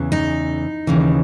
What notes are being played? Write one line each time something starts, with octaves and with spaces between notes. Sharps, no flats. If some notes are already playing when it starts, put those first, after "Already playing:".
Already playing: E2 C#3 E3
D#4
D#2 C#3 E3